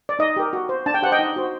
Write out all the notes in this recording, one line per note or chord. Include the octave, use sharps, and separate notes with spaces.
D5
D#4 D#5
G4 A#4
F#4
C5
D4 A5
G5
G4 C5 F#5
D#5 G5
D#4
F#4 C5